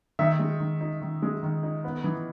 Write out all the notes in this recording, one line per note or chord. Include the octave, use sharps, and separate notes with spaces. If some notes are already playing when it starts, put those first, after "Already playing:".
D#3 E5
G#3
D#3
D#4
D#3
G#3
D#3
D#4
B3
E3